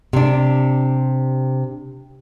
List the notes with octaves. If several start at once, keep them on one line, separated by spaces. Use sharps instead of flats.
C3 D4